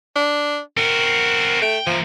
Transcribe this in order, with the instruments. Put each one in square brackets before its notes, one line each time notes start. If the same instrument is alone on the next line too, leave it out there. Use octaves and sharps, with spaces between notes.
[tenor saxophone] D4
[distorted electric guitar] C4 F#4 [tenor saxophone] A#4
[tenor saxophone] A3 [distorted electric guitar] G5
[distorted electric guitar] E3 A#3 [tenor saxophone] F3